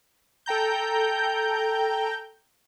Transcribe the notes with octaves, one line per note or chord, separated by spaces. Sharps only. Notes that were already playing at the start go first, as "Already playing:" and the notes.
A4 G5 A#5 G6